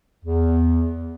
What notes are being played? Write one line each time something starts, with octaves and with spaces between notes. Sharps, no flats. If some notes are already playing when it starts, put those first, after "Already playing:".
E2